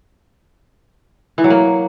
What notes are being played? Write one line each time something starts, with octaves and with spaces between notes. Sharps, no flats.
E3
F#3
A#3